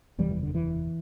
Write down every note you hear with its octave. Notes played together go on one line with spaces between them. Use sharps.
F#1 E2 C3 E3 G3
E3
D3
E3